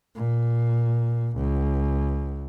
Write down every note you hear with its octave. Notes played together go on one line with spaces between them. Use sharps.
A#2
C#2